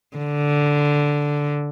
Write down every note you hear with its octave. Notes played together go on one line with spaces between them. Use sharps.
D3